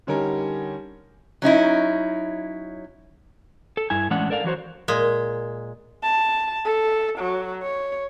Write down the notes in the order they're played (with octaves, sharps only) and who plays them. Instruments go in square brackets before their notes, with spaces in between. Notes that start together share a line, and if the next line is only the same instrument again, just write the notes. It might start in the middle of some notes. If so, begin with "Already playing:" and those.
[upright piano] D3 G3 C#4 D#4 G4 A#4
[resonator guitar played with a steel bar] F#3 C#4 D#4 E4
[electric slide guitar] A4
G2 E4 G#5
A2 E3 G#3 C#4 D4 F#5
A4 A#4 D5 E5 F5
E3 F#3 F#4 C5
[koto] A#2 G#3
[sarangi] A5
A4
F#3
C#5